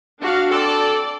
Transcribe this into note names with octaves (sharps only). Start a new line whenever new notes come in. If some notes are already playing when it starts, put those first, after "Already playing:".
D4 F#4 F5
C4 A4 D5